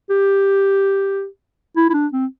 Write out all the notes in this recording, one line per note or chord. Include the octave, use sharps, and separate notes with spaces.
G4
E4
E4
D4
C4